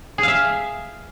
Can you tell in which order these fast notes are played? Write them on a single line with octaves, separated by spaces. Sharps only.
G#4 F5 E5